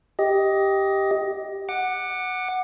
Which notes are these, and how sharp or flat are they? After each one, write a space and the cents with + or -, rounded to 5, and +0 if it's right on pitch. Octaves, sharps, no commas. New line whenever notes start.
G4 +0 D#5 +15
F#5 +0 D6 +30